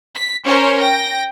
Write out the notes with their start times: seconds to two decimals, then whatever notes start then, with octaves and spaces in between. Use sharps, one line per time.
0.15 B6
0.45 C#4 A#4 C5 C#5
0.80 G5 A#6